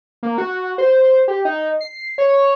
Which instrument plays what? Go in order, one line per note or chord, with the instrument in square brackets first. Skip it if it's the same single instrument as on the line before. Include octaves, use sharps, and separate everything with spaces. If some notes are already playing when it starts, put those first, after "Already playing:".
[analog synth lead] A#3
F#4
C5
G4
D#4
C7
C#5